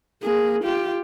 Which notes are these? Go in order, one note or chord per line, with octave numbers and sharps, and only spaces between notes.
A#3 G#4
F4 G4